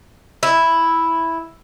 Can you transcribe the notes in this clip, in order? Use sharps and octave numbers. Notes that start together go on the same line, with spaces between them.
E4